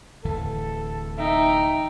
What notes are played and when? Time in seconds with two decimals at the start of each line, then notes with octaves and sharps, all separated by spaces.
0.25 D1 E3 A4
1.18 D#4 E5 G5